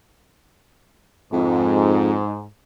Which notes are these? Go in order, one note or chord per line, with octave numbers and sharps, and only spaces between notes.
F2 G#2